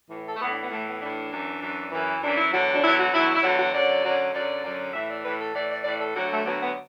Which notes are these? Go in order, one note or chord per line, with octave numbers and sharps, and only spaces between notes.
A2 E3
A4
A3
A2 E3 B3
D4
B3
A2 E3 A3
B3
A2 E3 D4
F#2 E3
F#2 E3
F#2 E3
F#2 E3 D4
E4
E2 D3 F#3 F#4
D4
E2 D3 F#3 E4
F#4
E2 D3 F#3 E4
E4
E2 D3 F#3 F#4
F#4
F#2 D3 F#3 D5
F#2 D3 F#3
F#2 D3 F#3 D5
F#2 D3 F#3
A2 E3 E5
D5
A2 E3 B4
A4
A2 E3 D5
D5
A2 E3 D5
A4
D2 D3 F#3 F#4
A3
D2 D3 F#3 B3
B3